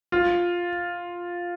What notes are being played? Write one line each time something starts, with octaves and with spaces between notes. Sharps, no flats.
F4